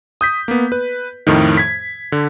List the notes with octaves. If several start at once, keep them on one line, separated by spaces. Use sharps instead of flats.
D#6 G6 B6
A#3 B3
B4
F2 A2 D#3
G#6 B6
D3